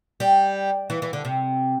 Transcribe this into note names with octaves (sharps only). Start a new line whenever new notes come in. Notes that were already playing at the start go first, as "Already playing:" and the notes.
G3
E3
E3
D3
C3